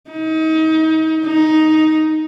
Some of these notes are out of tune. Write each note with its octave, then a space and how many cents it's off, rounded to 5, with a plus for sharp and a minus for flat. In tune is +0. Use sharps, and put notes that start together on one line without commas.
D#4 +35
D#4 +5